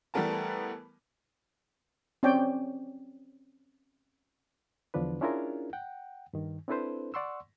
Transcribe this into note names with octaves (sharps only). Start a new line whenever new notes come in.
E3 G3 A3 B3 A#4 A5
C4 C#4 C#5 D5 G5
E2 D3 F3 D4 B4
C#4 D4 E4 F4 G#4 A#4
F#5 G5
G2 D#3
C4 D4 E4 A4 B4 C5
D5 F#5 C6 C#6 E6